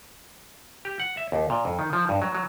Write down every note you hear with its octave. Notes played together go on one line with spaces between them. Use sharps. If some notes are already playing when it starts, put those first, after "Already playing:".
G4
F#5
E5
D#2
A#2
F2
D#3
F3
G2
F#3
F#3